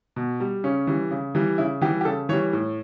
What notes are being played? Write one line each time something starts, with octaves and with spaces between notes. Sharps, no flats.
B2
G3
C#3 C#4
E3 G3
C#3
E3 G3
C#3 E4
E3 G3 G4
G4
C#3 A4
E3 G3 C#5
A2